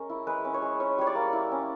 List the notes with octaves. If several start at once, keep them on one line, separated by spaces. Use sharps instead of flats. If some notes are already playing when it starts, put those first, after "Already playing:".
Already playing: G#3 C#4 A#4
E4
G#3 B4
C#4
C#5
G#3
C#4 C#5
G3 C#5
D5
A#3
E4
C#4